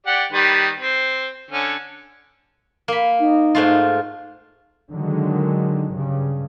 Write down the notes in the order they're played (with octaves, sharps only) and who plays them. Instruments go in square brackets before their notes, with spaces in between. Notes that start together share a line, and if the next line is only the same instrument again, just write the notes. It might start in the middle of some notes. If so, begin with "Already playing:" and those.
[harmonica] G4 D5 F#5
D#3 G3 B4
C4
D3 C#4
[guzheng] A#3 B5
[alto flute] D#4
[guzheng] G#2 A3 F4
[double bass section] D3 D#3 F#3 G#3
G2 C#3